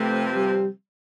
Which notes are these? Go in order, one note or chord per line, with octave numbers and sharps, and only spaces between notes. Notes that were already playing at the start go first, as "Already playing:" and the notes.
Already playing: C3 F3 A3 C4 G4 B4
G3